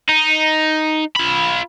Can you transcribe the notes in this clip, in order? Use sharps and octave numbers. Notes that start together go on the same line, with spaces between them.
D#4
F4 B5